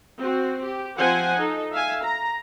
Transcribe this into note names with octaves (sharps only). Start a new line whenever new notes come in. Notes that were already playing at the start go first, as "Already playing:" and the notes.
C4 F#4
G4
F3 C4 C5 F#5 G#5
D#4 A4
E5 F5 G#5
A#5